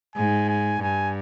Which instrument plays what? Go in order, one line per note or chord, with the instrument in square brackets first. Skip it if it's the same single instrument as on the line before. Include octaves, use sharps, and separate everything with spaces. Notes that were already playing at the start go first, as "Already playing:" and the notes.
[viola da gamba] G#2 [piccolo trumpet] G#5
[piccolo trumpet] G#5
[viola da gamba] G2 [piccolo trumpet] G#5